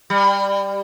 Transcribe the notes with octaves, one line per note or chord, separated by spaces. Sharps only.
G3